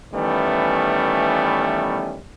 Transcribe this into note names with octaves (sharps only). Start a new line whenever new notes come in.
D#3 E3 G3 A3 B3 C#4